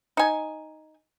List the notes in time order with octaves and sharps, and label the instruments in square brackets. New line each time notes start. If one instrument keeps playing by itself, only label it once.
[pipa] D#4 G#5